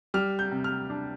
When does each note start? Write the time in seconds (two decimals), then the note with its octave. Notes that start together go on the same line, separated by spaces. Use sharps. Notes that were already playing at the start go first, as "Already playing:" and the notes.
0.14 G3 F6
0.39 G6
0.51 C3
0.64 F6
0.90 D4